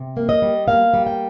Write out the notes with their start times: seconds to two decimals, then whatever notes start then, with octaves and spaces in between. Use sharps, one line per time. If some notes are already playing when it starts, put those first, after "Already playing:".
Already playing: C3
0.17 A#3
0.29 D#5
0.42 G3
0.68 A#3 F5
0.94 G3
1.07 G5